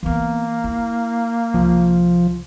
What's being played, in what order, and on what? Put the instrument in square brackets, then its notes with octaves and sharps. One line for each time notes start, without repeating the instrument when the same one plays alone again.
[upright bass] E3 B3 [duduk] A#3
[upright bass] E4
[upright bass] C2 [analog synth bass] F3